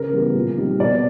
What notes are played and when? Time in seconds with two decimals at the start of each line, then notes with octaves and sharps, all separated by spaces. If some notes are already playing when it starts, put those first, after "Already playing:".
Already playing: C#3 A#4
0.12 E3 G3 B3
0.35 A#2
0.57 G3 C4 D#4
0.80 B2 D5